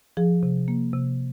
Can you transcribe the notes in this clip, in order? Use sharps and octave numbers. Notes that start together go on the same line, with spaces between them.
F3 G#4
C3
A#3
C3